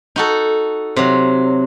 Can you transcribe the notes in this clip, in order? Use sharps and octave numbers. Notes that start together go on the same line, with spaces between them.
D#4 F#4 A4
C3 F#3